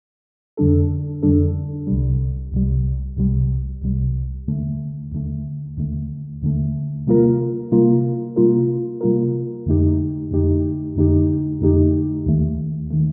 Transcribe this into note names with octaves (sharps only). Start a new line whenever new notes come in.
F2 D3 G3 D4 A4
F2 D3 G3 D4 A4
C2 C3 G3
C2 C3 G3
C2 C3 G3
C2 C3 G3
D#2 D3 A3
D#2 D3 A3
D#2 D3 A3
D#2 D3 A3
C3 G3 A#3 F4 A#4
C3 G3 A#3 F4 A#4
C3 G3 A#3 F4 A#4
C3 G3 A#3 F4 A#4
F2 D3 A3 D#4 G4
F2 D3 A3 D#4 G4
F2 D3 A3 D#4 G4
F2 D3 A3 D#4 G4
D#2 D#3 A3
D#3 A3